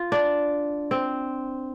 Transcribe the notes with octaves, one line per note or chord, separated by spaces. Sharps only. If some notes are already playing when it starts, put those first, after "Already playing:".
Already playing: F4
D4
C4